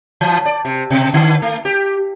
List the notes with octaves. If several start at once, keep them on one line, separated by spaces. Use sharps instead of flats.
E3
D5
C3
B2
D3
A3
G4